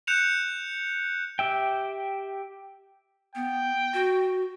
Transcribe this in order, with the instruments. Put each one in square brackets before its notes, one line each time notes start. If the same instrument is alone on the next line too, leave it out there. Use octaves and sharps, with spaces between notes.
[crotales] F#6 G6 C#7 E7 F7
[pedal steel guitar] G4 E5 G5
[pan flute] B3 [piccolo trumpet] G5
[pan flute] F#4